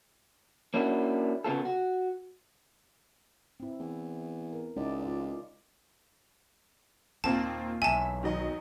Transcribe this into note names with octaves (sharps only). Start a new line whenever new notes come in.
A#3 C#4 D4 E4 F#4
C#3 B3 F4 A4
F#4
C4 E4
E2
A#4
C#2 D#4 E4 D5
F4 D5
D#2 A#2 A#3 C4 F4 A5
B1 E2 E5 G#5 A5
D#3 F#3 D#5